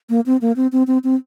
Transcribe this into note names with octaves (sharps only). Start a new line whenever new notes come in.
A#3
C4
A#3
C4
C4
C4
C4